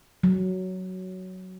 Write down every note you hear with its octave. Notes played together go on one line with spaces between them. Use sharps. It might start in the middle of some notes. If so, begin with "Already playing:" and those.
F#3